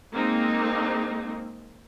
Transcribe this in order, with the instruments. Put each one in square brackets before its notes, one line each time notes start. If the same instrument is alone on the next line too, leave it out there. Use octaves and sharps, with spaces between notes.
[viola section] G#3 A#3 C4 D#4